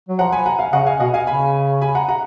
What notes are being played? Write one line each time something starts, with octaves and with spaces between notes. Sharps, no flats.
F#3
F3 F#5 A#5
G#5 B5
F#5 A#5
F5 G#5
C#3 D#5 F#5
F5 G#5
B2 D#5 F#5
F5 G#5
C#3 G#5 B5
G#5 B5
F#5 A#5
F#5 A#5